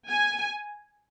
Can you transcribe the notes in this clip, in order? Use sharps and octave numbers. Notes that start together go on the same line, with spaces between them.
G#5